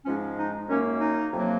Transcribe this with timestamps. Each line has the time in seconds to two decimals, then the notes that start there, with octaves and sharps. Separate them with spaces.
0.05 G#2 F3 G#3 C#4
0.38 D#4
0.68 F#2 D#3 A#3 C#4
1.00 D#4
1.32 F2 C3 F#3 A#3